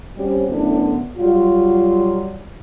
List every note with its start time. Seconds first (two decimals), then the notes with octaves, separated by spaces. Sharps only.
0.16 G3 C4 C#4 F#4 G4
0.48 F#2 A2 D3 E3 B3
1.17 F#3 G3 F4